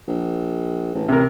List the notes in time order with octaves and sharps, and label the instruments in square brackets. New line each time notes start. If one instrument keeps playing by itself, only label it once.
[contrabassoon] A#1
A1
[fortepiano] C3 A#4